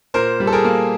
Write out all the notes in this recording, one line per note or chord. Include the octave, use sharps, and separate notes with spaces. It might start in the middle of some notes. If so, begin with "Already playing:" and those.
A#2 A#4 C5
G3
A4
G#4 A#4
A#3